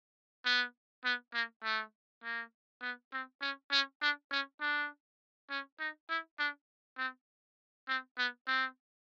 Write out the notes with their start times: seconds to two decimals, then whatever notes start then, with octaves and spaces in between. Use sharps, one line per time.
0.45 B3
1.05 B3
1.34 A#3
1.63 A3
2.24 A#3
2.82 B3
3.12 C4
3.41 C#4
3.71 C#4
4.01 D4
4.31 C#4
4.61 D4
5.50 C#4
5.79 D#4
6.09 E4
6.39 D4
6.98 C4
7.88 C4
8.18 B3
8.47 C4